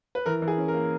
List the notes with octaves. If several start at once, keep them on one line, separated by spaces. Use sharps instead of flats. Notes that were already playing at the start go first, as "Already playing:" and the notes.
B4
E3 A#4
E3
G#4
C#4
A#4
A#3